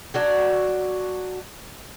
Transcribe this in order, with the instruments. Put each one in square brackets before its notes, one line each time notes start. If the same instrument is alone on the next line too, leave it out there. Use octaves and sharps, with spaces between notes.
[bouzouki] F#3 D4 F#4